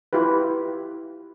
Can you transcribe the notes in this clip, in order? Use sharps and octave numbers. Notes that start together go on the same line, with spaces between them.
E4 F4 G4 B4